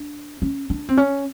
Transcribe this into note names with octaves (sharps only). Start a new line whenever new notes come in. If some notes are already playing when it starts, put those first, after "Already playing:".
Already playing: D4
C#4
D4
C4
C#4